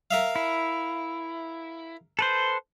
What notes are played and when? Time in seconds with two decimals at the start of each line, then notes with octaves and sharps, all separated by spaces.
0.11 A#4 E5 F5
0.36 E4
2.19 A4 B4 C5